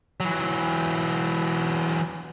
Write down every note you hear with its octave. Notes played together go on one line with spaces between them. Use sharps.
E3 F#3